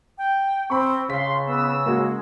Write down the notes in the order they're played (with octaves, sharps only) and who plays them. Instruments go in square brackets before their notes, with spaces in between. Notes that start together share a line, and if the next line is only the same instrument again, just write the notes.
[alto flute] G5
[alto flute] C4 [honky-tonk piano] B5 C#6
[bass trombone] C#3 [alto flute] F5 [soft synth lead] C6 [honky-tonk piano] B6
[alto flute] B3 [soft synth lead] E6
[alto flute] G#3 [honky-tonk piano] A#3 F#4